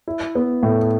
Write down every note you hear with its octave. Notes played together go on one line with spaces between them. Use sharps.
E4
B3
A2